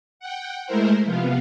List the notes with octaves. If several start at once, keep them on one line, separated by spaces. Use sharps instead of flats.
F#5 G5
G#3 A3 E4 A#4 C5
C3 F3 B3 F4